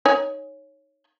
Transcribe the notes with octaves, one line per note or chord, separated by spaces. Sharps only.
D#4 C#5 G#5